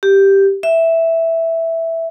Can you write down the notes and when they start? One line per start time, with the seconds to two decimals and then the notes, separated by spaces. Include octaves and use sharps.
0.03 G4
0.63 E5